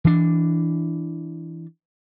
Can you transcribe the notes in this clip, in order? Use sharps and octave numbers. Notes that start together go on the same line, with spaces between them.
E3 D4